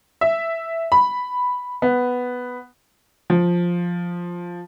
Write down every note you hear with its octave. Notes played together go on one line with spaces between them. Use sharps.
E5
B5
B3
F3